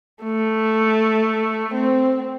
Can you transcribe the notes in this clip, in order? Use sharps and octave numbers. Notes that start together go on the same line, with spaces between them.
A3
C4